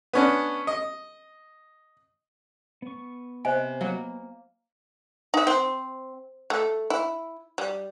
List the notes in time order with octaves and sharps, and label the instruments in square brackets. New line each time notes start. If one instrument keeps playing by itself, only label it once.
[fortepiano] B3 C#4 D4
D#5
[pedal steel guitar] B3 C#6
[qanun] C3 [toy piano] C5 D#5 G#5
[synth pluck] F#3 [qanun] A#3
[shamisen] D#4 E5
C4
A3
E4
G3